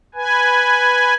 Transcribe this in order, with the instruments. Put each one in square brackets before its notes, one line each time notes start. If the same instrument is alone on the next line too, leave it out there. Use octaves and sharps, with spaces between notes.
[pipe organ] B4 G#5